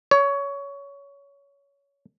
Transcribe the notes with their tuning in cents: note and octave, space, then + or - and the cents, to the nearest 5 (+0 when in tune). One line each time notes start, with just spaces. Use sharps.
C#5 +20